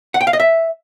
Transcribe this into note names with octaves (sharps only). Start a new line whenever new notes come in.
F#5
G5
F5
D#5
E5